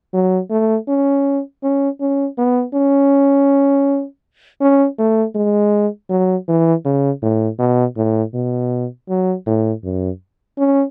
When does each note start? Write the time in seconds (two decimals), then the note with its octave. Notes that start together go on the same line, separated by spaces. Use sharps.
0.14 F#3
0.50 A3
0.88 C#4
1.63 C#4
2.01 C#4
2.38 B3
2.74 C#4
4.61 C#4
4.99 A3
5.35 G#3
6.10 F#3
6.48 E3
6.85 C#3
7.22 A2
7.59 B2
7.97 A2
8.34 B2
9.09 F#3
9.47 A2
9.84 F#2
10.58 C#4